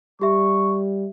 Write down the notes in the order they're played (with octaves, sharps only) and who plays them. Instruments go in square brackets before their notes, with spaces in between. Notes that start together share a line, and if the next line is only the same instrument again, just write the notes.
[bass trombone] G3 [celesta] G4 E5 [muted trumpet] C#6